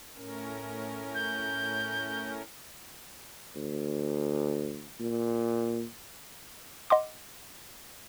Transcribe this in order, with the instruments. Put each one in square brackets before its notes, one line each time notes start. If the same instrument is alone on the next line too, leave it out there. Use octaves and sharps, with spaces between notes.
[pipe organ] A2 C#4 A#4
[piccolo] G6
[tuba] D2
A#2
[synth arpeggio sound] D#5 F#5 C6 D6